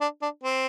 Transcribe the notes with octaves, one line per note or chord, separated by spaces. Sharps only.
D4
D4
C4